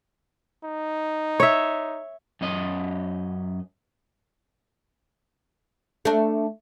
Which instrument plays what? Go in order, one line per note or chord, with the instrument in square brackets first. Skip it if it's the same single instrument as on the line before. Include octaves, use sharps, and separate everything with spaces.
[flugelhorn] D#4
[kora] C#5 E5
[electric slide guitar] F#2 C#4 D#5
[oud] A3 D4